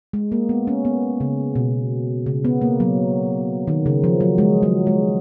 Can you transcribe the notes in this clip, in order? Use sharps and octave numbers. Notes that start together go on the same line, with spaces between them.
G#3
A#3
B3
C#4
B3
C#3
B2
C#3
B3
A#3
F#3
D#3
C#3
F3
F#3
G#3
F#3
G#3